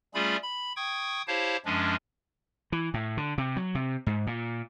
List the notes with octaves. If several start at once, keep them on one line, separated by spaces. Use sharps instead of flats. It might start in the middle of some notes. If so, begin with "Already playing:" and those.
G3 A3 C#4 F4 G#4 B5
B5
G5 C#6 D#6 G#6
E4 G4 C5 C#5 F5 A5
F#2 F3 G#3 C#4 D4
E3
A2
D3
C3
F#3
C3
G#2
A#2